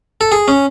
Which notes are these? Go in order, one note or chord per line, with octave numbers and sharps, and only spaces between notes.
A4
G#4
C#4